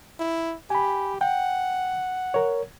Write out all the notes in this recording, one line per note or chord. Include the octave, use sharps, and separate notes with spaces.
E4
G4 G#5 B5
F#5 G5
A#4 C#5